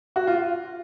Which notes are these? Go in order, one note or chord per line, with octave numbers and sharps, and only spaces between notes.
F#4
F4